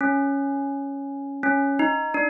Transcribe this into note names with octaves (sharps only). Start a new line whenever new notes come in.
C#4
C#4
D#4
D4